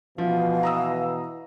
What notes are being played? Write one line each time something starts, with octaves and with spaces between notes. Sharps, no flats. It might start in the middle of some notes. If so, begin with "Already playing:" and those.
B2 E3 F3 F5
A#5 D#6 E6